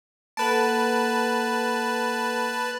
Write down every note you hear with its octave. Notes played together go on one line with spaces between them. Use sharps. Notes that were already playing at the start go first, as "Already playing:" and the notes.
A#3 A4 B4 F#5 A5